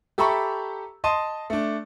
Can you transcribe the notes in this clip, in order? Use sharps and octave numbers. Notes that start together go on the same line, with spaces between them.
G4 A4 E5 A#5 B5 C#6
D#5 A5 C6 D#6 D#7
A3 D4